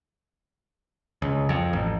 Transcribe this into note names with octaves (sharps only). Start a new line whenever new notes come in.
C#2
F2
A1